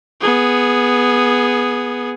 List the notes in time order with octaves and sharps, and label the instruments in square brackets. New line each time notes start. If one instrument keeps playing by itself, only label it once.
[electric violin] B3 G#4